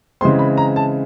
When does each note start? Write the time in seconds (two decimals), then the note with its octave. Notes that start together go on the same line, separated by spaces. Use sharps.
0.21 C#3 E3 G#3 C4 C6
0.39 B5
0.57 A#5
0.76 A5